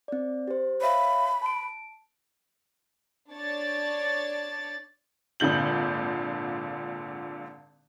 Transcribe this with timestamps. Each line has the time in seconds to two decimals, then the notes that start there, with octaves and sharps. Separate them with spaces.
0.08 C4 D5
0.48 G4 C5
0.82 C#5 E5 F5 B5
1.42 A5 D7
3.31 D4 C#5 D5 A6
5.40 G#1 A#2 D3 G6 F#7